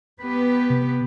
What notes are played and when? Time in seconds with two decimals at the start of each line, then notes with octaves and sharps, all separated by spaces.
0.19 B3 G4 B4
0.70 C3